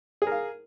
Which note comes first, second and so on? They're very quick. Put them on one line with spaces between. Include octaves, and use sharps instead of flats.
G#4 A#4 F5